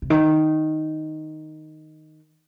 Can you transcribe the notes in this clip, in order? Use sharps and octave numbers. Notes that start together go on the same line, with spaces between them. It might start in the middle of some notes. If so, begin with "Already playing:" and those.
C3
D#3